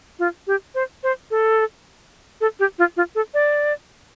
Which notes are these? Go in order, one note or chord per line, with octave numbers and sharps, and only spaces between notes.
F4
G4
C5
C5
A4
A4
G4
F4
F4
A4
D5